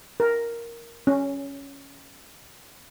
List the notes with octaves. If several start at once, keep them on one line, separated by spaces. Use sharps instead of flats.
A#4
C#4